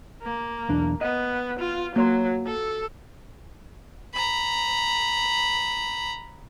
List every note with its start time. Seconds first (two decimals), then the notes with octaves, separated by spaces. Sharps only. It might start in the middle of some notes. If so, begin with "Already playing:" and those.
0.23 A#3
0.69 B1 E2 D4
1.01 B3 D#5
1.60 F4
1.96 F#3 A#3 C#5 C6
2.47 A4
4.13 A#5 B5